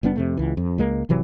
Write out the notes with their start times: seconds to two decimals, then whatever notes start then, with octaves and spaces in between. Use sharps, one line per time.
0.03 F#1 G3 B3 D4
0.16 F2 C3 A3
0.37 C#2 E3
0.57 F2
0.78 C#2 G#3 A#3
1.09 G#1 C3 E3 F#3